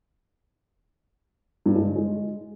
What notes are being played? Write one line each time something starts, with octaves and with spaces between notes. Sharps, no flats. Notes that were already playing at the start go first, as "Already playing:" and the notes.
G2
G#3
D3
G#3